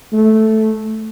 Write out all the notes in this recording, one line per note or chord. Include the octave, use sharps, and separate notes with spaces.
A3